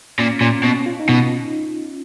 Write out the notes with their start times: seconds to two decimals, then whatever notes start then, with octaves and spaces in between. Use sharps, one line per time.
0.19 A#2 C#4
0.41 A#2 C#4
0.64 B2 C#4
0.86 F4
1.00 D#4
1.09 B2